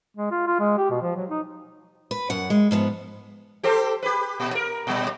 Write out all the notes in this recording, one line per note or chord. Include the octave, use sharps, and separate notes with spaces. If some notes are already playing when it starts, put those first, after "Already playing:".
G#3
F4
F4
G#3
G4
B2
F3
F#3
D#4
B4
F#2 F#5
G#3
G#2 F3 B3
G4 A4 C5
G4 B4
A#2
A#4
A#2 G3